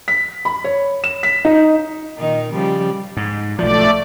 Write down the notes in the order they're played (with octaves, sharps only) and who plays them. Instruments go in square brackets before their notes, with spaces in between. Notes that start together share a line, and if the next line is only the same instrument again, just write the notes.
[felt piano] B6
B5
C#5
E7
B6
D#4
[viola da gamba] A#2 D#3 D#4
C#3 F3 G3
[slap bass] G#2
[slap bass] B1 F3 [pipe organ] A3 D5